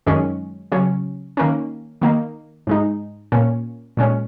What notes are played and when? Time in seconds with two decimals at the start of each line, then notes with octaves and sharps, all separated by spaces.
0.07 F#2 D#3 G#3 C#4
0.72 C#3 F#3 C#4
1.37 D#3 A#3 C#4
2.02 D#3 A#3 D#4
2.67 G#2 G#3 D#4
3.32 A#2 A#3 C#4
3.97 A#2 G#3 C#4